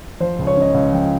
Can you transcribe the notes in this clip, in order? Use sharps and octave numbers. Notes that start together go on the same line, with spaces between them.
F3 C5
C#2
C#5
C#3 D#5
C#2 F5
F3 G5